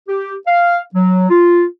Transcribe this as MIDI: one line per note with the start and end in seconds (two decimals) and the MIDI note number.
0.08 0.34 67
0.48 0.79 77
0.95 1.29 54
1.30 1.64 65